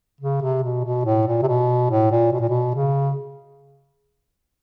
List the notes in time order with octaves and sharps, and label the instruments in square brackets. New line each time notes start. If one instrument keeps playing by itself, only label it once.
[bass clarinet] C#3
C3
B2
B2
A2
A#2
C3
B2
A2
A#2
B2
A#2
B2
C#3